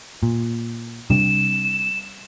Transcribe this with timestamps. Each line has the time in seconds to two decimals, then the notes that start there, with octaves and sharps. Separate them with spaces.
0.23 A#2
1.10 C3 G3 D4 E7